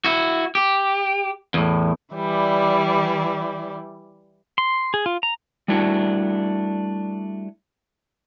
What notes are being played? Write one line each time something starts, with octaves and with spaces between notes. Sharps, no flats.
E4 F#4
G4
E2 A2
E3 G3 E4 D5
C6
G#4
F4
A#5
G3 A3 D4 E4 F#4